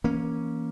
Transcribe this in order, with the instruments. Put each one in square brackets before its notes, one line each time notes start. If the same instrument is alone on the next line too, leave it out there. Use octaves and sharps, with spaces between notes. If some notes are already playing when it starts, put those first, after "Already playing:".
[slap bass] E3 A#3 C#4